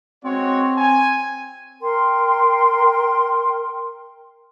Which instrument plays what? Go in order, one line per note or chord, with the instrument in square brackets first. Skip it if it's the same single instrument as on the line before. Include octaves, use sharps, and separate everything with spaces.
[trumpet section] G#3 F#4 C#5 [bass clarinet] C4
[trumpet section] G#5
[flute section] A#4 G5 C6